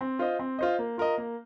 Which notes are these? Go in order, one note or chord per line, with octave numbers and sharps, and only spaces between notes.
C4
F4 C5 D#5
C4
F4 C5 D#5
A#3
F4 A#4 D#5
A#3